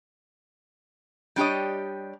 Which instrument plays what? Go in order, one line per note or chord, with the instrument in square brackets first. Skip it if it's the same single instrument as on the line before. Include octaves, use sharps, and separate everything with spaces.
[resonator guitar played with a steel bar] G3 D4 G4 C#5 D#5